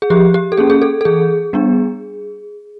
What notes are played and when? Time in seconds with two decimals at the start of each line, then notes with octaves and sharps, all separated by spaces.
0.02 G#4
0.10 F3 G4
0.34 G4
0.52 A4
0.57 A#3 C#4 G#4
0.70 G#4
0.82 A4
1.01 A4
1.05 E3 G#4
1.53 G3 B3 D4